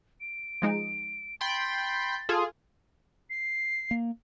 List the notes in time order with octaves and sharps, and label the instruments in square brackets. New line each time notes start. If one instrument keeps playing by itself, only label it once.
[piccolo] D7
[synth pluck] F3 G#3 D#4
[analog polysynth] G5 B5 C6 [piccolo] A6
[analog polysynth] F4 G#4 [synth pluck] A4
[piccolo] C7
[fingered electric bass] A#3